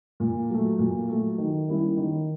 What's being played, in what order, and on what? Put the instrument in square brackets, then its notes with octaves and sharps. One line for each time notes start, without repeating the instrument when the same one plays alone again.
[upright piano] A#2
F#3 A3
A#2
F#3 A3
D#3
G3 A#3 C#4 E4
D#3